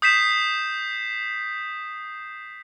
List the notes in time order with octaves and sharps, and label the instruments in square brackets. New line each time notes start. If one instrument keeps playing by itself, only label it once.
[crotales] D#6 G6 B6 C7 E7